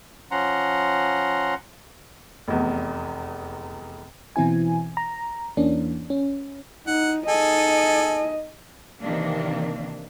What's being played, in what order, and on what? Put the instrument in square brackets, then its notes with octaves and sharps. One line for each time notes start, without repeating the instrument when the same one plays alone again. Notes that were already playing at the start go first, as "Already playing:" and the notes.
[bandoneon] F3 C#4 F#5 A#5 C6
[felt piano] F1 E2
[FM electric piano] B2 E3 C4 E4 G#5
A#5
E2 E3 A#3 C#4 D4
C#4
[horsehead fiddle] D#4 [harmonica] F#5
[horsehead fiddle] D#4 D#5 [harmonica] G#4 A4
[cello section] C3 D#3 E3 A#3 D4